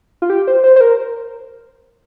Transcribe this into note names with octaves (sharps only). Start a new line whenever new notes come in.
F4
G4
C5
C5
C5
A#4